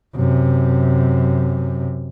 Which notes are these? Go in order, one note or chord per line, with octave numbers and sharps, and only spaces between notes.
F#2 C3